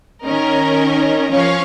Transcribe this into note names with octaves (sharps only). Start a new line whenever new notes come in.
D#3 C#4 A#4 D#5
F3 C#4 C#5 F5